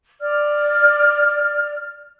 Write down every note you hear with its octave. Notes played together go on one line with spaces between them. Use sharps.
D5 F6